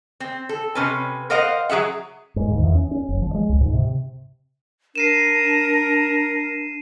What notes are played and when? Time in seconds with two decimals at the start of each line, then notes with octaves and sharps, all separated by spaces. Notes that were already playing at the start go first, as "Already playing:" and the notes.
0.20 C4
0.49 A4
0.75 C3 C#4 B4
1.30 A#4 C5 D#5 F5 F#5
1.69 F#3 G#4 E5 F#5
2.36 G#2
2.51 D#2
2.63 E2
2.75 C#4
2.91 C#4
3.09 F#1
3.22 F3
3.34 G#3
3.49 C#2
3.61 G#2
3.74 C3
4.95 D4 A#4 C7 D#7 E7